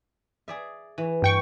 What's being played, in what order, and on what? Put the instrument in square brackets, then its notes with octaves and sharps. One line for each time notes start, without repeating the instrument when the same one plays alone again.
[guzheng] G#4 D5 E5
E3
[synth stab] G2 G5 C#6